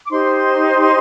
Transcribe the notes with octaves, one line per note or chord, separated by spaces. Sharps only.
D6
D#4 G4 C5 C6